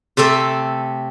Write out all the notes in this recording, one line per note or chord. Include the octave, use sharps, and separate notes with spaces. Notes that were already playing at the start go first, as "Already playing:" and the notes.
C3 A3 C4 A4